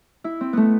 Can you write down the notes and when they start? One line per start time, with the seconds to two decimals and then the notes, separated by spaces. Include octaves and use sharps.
0.24 E4
0.41 C4
0.53 A3 B3